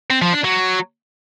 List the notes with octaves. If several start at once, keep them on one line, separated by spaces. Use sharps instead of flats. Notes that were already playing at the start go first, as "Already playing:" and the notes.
C4
F3
D4
F#3